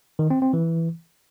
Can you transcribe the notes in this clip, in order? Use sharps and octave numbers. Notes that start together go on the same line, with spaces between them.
D#3
C4
C4
E3